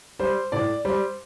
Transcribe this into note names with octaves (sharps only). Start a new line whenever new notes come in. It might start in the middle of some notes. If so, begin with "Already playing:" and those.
G3 C5
A2 D5
G3 C5